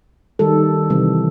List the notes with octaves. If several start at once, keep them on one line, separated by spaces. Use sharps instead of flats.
D#3 G3 A4
C3 E3 G3